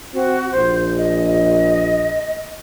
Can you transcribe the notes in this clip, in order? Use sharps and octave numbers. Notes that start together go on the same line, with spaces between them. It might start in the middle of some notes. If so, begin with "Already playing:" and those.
C4 F#4
A#1 C5
D#5